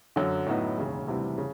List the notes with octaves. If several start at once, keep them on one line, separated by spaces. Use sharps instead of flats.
F#2 D3 F#3
A2 F#3 B3 D#4
E1 D#2 C#3
D2 C3 E3 G3
C#3